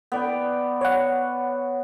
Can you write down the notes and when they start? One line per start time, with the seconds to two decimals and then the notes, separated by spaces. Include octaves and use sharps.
0.12 B3 D5 G5
0.81 C#5 F#5